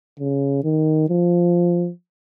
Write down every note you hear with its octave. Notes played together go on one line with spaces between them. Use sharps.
C#3
D#3
F3